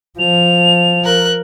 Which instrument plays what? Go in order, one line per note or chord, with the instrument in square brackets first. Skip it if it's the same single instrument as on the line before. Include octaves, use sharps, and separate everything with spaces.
[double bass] F3 [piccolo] F7
[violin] A#4 F#6